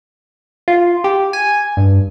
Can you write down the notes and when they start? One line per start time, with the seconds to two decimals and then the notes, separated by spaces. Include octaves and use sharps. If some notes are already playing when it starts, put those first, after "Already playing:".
0.68 F4
1.04 G4
1.33 G#5
1.77 G2